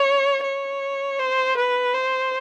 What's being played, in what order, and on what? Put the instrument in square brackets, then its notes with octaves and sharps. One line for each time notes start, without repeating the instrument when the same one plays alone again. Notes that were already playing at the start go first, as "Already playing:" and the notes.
Already playing: [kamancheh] C#5
C#5
C5
B4
C5